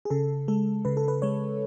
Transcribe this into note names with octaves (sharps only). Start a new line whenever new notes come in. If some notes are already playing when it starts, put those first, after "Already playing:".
G#4
C#3 A4
G#3 A4
C#3 B4
A4
B4
G#3 C#5